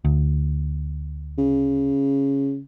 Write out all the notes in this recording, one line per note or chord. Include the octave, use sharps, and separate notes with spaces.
D2
C#3